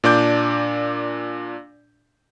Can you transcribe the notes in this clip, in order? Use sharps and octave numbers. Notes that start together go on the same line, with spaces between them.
A#2 D4 D5 D6 G6